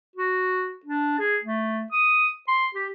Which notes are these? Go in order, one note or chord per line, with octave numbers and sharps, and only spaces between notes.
F#4
D4
G#4
A3
D#6
C6
G4